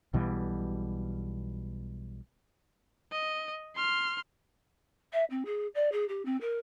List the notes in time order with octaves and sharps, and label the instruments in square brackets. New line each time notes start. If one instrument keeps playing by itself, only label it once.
[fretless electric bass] B1 B2 E3 G3
[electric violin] D#5
C6 F6
[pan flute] E5
C4
G#4
D5
G#4
G4
C4
A#4